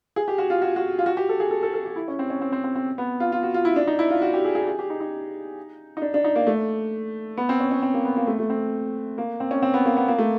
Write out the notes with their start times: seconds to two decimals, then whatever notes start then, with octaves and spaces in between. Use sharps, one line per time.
0.16 G#4
0.28 G4
0.38 F#4
0.50 F4
0.62 F#4
0.76 F#4
0.99 F4
1.06 F#4
1.17 G4
1.29 A4
1.40 G#4
1.51 A4
1.63 A4
1.74 A4
1.86 G4
1.96 E4
2.08 C#4
2.19 C4
2.30 C#4
2.41 C4
2.52 C4
2.64 C4
2.75 C4
2.98 B3
3.20 F4
3.32 F4
3.43 F#4
3.54 F4
3.65 E4
3.76 D4
3.87 D#4
3.99 E4
4.10 F4
4.22 F#4
4.34 G4
4.45 G#4
4.55 G#4
4.67 G#4
4.79 G4
4.90 D#4
5.01 D#4
5.97 D#4
6.02 D4
6.14 D4
6.24 D#4
6.36 A#3
6.47 A3
7.37 B3
7.49 C4
7.60 C#4
7.71 C#4
7.82 C4
7.94 A#3
8.05 B3
8.16 A#3
8.27 A3
8.39 A3
8.50 C4
9.18 A#3
9.40 C4
9.51 C#4
9.62 C4
9.74 B3
9.85 A#3
9.97 B3
10.08 A#3
10.18 A3